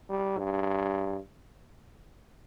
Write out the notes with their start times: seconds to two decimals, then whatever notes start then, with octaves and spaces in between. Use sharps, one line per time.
0.10 G3
0.38 G2